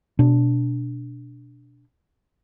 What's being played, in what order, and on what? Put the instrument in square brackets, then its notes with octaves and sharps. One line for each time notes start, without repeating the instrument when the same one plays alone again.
[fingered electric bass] B2 D4